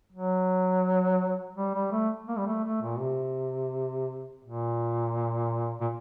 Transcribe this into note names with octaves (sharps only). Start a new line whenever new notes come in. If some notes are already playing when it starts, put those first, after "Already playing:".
F#3
G3
G3
A3
A#3
G3
A3
A3
A#2
C3
A#2
A#2